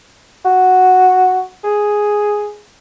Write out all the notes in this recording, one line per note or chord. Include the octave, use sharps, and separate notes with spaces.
F#4
G#4